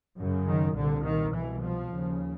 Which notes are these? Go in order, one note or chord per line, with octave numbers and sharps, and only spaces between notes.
F#2 C#3
D#3
C2 A#2 D3
D#3
C2 B2 E3
F3
D#2 C#3